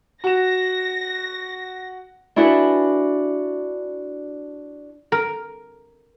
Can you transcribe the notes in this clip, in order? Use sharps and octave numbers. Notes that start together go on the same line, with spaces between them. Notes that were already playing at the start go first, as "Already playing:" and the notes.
F#4 A#6 E7
D4 E4 F#4 G#4 A4 B4
A#4